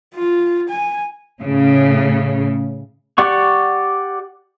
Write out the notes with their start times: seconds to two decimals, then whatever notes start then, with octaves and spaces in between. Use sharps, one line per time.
0.15 F4
0.69 G#5
1.45 A2 C#3
3.18 G4 D5 F#5 C#6